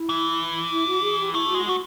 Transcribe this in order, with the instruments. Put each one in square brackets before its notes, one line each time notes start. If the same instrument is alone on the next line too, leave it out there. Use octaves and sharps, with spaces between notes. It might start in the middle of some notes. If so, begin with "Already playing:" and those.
Already playing: [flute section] E4
[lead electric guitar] E3
[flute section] E4
F#4
G#4
G4
[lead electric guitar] A3 [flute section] E4
[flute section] F#4
[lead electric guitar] G#3
[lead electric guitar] A3 [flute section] F#4